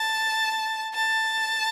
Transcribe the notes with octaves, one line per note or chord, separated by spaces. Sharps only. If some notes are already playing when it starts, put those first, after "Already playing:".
Already playing: A5
A5